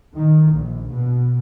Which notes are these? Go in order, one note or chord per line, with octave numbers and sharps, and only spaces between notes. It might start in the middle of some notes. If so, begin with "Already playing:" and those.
D#3
A#1
B2